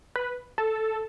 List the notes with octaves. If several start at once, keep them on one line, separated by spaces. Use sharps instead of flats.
B4
A4